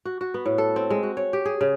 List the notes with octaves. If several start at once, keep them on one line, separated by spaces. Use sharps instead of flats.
F#4
F#4
B3
A2
A4
C4
G#3
F#4
C#5
G4
G#4
C#3